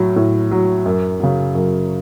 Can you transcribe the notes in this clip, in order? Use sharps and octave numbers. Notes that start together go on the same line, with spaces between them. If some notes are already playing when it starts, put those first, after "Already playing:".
Already playing: A2 F#3
A2
F#3
F#2
C#3 F#3
F#2